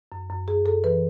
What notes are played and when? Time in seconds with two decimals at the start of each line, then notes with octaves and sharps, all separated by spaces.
0.12 F#2
0.30 F#2
0.48 F#2 G#4
0.65 F#2 A4
0.84 E3 B4